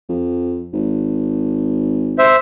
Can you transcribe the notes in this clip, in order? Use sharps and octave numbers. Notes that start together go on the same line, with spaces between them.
F2
G#1
C5 E5